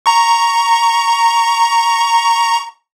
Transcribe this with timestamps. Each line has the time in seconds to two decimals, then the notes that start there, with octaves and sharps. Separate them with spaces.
0.06 A#5 C#6